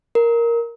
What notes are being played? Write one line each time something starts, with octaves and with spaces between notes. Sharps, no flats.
A#4